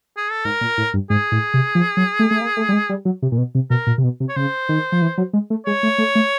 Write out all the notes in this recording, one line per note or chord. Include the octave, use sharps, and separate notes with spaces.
G#4
A4
G#2 A#4
A#2
A2
G2
G#2 G#4
A2
C3
F3
F#3
A3
A3
A#3
A3
G3
G#3
G3
F#3
C3
A#2
B2
C3
B2 A#4
A#2
C3
B2
C3
C#5
C#3 C5
D#3
F3
E3
F#3
G#3
A3
G#3 C#5
A3
A3
A3